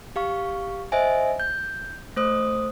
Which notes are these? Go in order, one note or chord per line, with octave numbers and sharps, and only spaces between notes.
G4 F5 C#6
C5 D#5 E5 G#5
G6
A3 C5 D#6